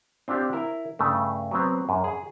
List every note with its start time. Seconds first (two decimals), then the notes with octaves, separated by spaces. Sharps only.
0.28 C4 D4 F4 G4
0.53 E4 A#4
0.99 G2 C#3 A3
1.51 F#3 B3 C4
1.89 F#2
2.04 G#4